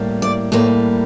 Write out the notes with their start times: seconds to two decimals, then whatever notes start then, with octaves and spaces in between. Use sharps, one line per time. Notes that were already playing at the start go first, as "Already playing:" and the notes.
Already playing: A2 G3 A#3
0.22 D5
0.52 A2 G3 A#3 C#5